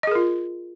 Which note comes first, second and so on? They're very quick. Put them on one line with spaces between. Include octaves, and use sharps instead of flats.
D#5 G#4 A#4 F4